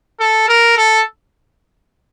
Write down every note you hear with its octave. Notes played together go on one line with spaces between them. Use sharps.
A4
A#4
A4